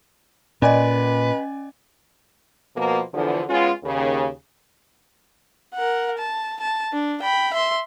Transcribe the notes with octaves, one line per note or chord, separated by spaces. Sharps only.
A#2 C#4 B4 D5 D#5 G#5
B2 F3 A#3
E2 D3 F3
G#3 B3 C#4 F4
D#2 C#3
A#4 F#5
A5
A5
D4
G5 B5
E5 C6